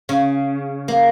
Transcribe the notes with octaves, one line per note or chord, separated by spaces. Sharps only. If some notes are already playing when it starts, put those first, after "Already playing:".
C#3
A#3